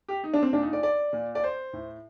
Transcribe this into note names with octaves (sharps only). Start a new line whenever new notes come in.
G4
D#4
D4
C4
A#2 D4
D#4
D5
D5
A#2
D5
C5
A2